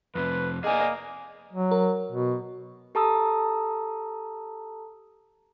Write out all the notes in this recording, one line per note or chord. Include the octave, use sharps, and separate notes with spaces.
F2 C3 B4
A#3 G#4 D5 D#5 G#5
F#3
A#4
B2
G4 A4 A5 A#5 D#6 E6